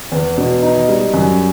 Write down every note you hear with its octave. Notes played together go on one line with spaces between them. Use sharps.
E2
B2
D#4
G3
F#2